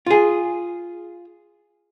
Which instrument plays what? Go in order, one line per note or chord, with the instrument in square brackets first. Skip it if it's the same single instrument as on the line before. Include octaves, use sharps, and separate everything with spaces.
[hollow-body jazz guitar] F4 G#4